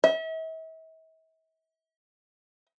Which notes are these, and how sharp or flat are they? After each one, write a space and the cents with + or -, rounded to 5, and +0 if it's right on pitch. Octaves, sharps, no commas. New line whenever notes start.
E5 -40